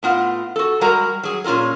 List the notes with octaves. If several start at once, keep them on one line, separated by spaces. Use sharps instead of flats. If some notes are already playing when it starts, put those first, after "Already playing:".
A2 B3 F4 F#5
F#4 A4
G3 G#3 F#4 A#4 A#5
F#3 G#4
A#2 C#4 F4 A4 A#4